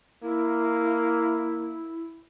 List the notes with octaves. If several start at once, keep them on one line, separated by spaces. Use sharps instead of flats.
A#3 E4